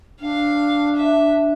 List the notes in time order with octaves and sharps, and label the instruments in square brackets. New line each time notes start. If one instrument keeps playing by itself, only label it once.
[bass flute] D4 [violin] F5
[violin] E5